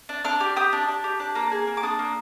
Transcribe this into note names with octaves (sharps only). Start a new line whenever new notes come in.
D4
D4 F6
G4
G4 D#6
D4
D4
G4
D4
A#3
G#4
A#3
D6
D4 D#6
A#3